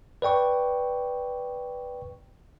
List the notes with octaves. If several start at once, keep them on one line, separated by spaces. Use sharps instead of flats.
B4 D5 G5 C#6